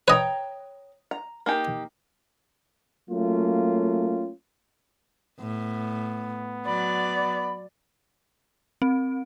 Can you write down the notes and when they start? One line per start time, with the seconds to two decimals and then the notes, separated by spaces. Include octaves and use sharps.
0.08 B4 C#5 D#5 G5 A#5
1.11 A#5
1.46 A#3 D#4 G4
3.10 F#3 A3 A#3 C#4 F4
5.40 A2 B3
6.66 F#3 D5 B5
8.82 C4